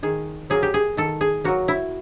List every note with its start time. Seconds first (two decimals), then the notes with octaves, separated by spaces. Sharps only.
0.03 D#3 G#4
0.50 F#3 A#3 G#4
0.63 G4
0.74 G#4
0.97 D#3 A4
1.21 G#4
1.44 F#3 A#3 F#4
1.68 E4